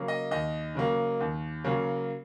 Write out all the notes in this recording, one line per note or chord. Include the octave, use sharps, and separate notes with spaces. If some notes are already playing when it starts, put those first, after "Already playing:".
Already playing: C#3 F#3 A#3
D#5
D#2 D#5
C#3 F#3 A#3
D#2
C#3 F#3 A#3